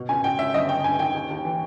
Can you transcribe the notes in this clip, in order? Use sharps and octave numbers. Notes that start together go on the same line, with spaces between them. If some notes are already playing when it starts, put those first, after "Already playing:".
Already playing: B2
C#2 G#5
B2 G5
C#2 E5
G1 D#5
G2 G5
G2 G#5
D#3 G5
D#2
D#2
E3